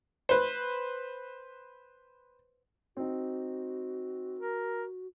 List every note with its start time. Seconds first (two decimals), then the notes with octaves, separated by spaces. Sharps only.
0.29 B4 C5
2.97 C4 D#4 F#4
4.39 A#4